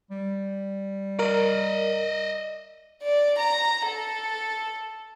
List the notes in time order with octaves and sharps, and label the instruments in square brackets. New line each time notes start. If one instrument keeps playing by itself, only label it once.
[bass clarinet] G3
[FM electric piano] A#4 [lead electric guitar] D5 D#5
[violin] D5
A#5
A4